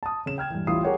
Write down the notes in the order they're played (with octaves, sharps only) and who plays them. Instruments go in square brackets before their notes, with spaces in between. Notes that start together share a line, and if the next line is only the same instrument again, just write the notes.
[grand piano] A5 D#6
C#3 E7
G5 F6 G#6
G2 E3
A1 G3 E4 F4 D#6 C7
G4 G#4 A#4 C#5 F#5 G5